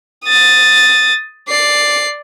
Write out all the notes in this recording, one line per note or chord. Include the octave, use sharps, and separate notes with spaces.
D#6 A6
D5 C7